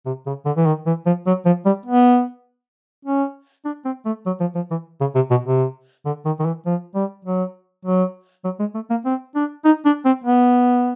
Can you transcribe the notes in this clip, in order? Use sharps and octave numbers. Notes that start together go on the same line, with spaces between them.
C3
C#3
D3
E3
D#3
E3
F3
F#3
F3
G3
B3
C#4
D4
C4
A3
F#3
F3
F3
E3
C#3
C3
B2
C3
D3
D#3
D#3
E3
F3
G3
F#3
F#3
F#3
G#3
A3
A#3
C4
D4
D#4
D4
C4
B3